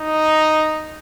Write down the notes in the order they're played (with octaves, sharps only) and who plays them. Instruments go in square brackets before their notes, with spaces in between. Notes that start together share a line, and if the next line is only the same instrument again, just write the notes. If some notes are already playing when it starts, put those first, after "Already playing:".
Already playing: [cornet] D#4